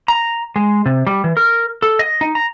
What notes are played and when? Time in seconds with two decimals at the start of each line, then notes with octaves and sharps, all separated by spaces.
0.08 A#5
0.56 G#3
0.86 C3
1.07 G3
1.24 E3
1.37 A#4
1.82 A4
1.99 D#5
2.21 D#4
2.35 A#5